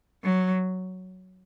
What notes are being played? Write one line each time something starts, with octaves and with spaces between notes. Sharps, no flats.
F#3